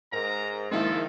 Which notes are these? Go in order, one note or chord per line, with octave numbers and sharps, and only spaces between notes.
G#2 A#4 A#5
D#3 F3 G#3 A#3 E4 A4